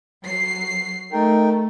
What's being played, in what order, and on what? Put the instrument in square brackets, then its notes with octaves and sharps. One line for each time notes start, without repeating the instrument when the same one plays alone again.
[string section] F#3 C7
[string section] A3 [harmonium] D#4 A#4 G5